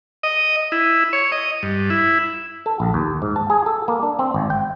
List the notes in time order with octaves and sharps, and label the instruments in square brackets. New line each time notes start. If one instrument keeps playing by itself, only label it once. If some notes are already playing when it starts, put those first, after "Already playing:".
[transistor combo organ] D#5
E4
C#5
D#5
G2
E4
[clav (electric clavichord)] A4
A#1
D#2
G#2
A5
G#4
A4
A#3
D4
C4
G#1
G5